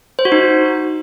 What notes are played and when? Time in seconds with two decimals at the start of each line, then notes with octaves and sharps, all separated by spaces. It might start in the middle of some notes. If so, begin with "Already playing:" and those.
0.19 C5
0.25 F#4
0.32 D#4